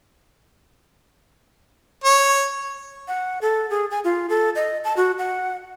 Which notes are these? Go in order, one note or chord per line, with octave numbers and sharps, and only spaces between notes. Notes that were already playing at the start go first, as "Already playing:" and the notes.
C#5
F#5
A4
G#4
G#5
F4
A4
D#5
A5
F#4
F#5